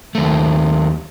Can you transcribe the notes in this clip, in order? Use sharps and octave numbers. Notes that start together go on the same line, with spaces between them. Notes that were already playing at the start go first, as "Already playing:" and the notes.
D#2 A3